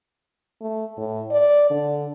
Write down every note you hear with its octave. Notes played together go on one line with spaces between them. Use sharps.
A3
A2
D5
D3